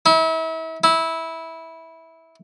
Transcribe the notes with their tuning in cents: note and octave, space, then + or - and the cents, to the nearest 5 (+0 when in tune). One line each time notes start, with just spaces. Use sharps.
E4 -35
E4 -15